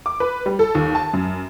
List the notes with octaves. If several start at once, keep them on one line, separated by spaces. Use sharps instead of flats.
D6
B4
G3
A4
D#2
A5
F#2